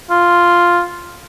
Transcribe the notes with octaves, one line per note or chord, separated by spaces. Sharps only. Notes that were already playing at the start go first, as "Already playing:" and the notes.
F4